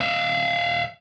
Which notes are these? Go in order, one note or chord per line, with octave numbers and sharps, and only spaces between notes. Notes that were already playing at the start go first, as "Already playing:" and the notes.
E5 F5